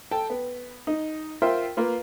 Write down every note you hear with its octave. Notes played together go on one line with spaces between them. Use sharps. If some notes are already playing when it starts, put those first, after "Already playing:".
A4 G5 A5
B3
D#4
F4 A#4 C5 E5 G5
A#3 F4 B4